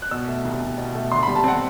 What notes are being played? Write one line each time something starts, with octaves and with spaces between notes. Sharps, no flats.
F#6
B2 E6
A3
C2
C2
B2
A3
D3 C6
G3 B5
A5
C4 F#5